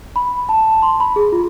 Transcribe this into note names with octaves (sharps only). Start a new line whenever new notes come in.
B5
A5
C6
B5
G#4
F4